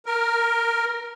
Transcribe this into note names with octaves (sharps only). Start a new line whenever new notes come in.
A#4